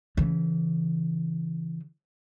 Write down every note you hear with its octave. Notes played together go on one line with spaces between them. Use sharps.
C#3 E3